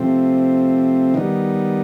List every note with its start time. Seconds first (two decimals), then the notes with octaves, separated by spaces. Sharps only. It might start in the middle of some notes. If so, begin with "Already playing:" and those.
Already playing: C3 F3 A3 C4
1.14 D#3 G3 B3 D#4